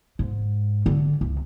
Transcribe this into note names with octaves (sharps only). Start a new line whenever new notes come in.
G#2
D3
C#2